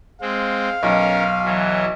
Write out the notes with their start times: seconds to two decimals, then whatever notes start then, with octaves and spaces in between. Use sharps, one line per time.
0.22 G#3 C4 F5
0.83 B1 C#4 A#4
1.45 E3 F#3